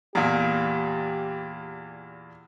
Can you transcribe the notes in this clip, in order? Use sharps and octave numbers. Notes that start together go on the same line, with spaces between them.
E2 A#2 G4